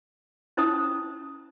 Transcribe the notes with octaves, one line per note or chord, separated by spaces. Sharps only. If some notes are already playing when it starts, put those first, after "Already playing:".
C#4 E4 C5 A5 A#5 D#6